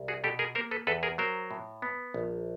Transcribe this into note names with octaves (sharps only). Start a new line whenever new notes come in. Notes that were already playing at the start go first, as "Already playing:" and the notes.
Already playing: C2
F#4 G#4
B2 G4 A4
G#4 A#4
A#3 A#4 C5
A4 B4
E2 A4 B4
G#4 A#4
F#3 A#4 C5
A2
B3
A#1